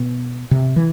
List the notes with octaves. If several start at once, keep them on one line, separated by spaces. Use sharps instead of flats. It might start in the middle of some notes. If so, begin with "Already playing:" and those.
Already playing: B2
C3
E3